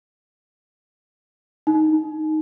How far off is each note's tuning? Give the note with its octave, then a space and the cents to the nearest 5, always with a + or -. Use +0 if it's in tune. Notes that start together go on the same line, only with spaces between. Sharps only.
D#4 -5